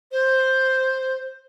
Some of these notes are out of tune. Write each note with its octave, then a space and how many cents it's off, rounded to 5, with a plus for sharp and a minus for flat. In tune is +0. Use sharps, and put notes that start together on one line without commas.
C5 +5